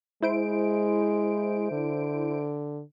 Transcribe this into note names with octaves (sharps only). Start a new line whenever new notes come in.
G#3 E4 C5 D7
D3